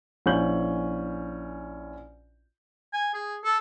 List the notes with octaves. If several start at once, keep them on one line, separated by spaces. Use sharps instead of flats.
A#1 C#4 E4 G6 F#7
G#5
G#4
A4